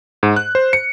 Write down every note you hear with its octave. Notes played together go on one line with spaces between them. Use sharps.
G#2
F#6
C5
C#7